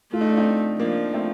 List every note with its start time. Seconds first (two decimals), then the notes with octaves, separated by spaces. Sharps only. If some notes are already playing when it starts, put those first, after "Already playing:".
0.13 A3 F4
0.21 D#4
0.29 D4
0.37 C4 D#4
0.80 F3 A#3 D4
1.14 A3 C4